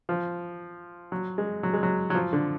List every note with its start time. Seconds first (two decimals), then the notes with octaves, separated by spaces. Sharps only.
0.09 F3
1.12 F#3
1.38 G#3
1.63 F#3
1.73 G#3
1.83 F#3
2.10 F#3
2.15 F3
2.33 D3